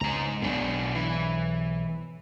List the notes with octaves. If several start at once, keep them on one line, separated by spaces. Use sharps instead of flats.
C#2 G#2 A#5
B1 G#2 B2 D4
E3